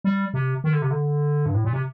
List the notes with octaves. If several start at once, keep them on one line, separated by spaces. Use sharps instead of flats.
G3
C3
D#3
D3
C3
D3
G2
A2
A#2
C3